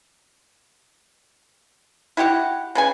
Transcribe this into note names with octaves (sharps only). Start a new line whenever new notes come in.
E4 F#4 G4 F#5
C#3 B4 G#5